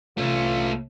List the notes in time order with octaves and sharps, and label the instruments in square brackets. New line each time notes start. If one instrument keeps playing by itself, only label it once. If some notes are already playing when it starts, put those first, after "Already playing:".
[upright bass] C2 C3 [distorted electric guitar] A3 C#4 [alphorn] F4